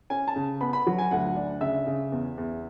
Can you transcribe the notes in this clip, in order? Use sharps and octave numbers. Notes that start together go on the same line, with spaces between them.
C#4 G#5
A5
C#3
B3 B5
B5
F#3
G#5
D2 F#5
D4
C#3 E5
C#3
E2
E2